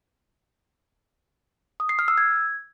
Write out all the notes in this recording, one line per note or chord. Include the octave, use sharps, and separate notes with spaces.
D#6
C7
F6
E6
G#6